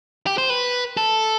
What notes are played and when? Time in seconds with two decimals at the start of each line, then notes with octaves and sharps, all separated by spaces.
0.26 G4
0.38 C5
0.50 B4
0.97 A4